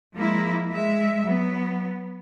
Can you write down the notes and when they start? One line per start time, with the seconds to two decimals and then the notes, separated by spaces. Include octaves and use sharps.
0.16 F3 G#3 A#3 E4
0.70 G#3 E5
1.25 F#3 B3